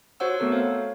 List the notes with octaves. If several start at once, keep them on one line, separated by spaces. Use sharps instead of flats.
F#4 C5 C#5 F#5 E6
A3 B3 C4 A4 A#4
C5 C#5 F5